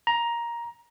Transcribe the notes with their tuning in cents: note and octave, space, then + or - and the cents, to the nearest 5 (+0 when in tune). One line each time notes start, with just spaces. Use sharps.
A#5 +10